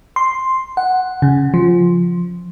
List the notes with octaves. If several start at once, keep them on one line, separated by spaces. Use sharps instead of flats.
C6
F#5
C#3
F3